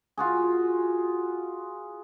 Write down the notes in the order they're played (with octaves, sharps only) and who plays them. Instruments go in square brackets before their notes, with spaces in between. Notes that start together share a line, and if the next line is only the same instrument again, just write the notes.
[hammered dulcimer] F4 F#4 G#4